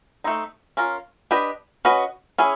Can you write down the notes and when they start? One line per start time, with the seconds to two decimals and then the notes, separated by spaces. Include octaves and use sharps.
0.24 A3 C4 D#4
0.77 C#4 F4 A#4
1.31 D4 G4 B4 D#5
1.85 C#4 F#4 B4 D#5
2.38 C#4 E4 G#4